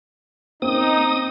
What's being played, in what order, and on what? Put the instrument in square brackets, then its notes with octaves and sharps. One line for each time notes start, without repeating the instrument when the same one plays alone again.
[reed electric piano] A#3 C#4 [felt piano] C4 [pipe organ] D#4 [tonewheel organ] D#6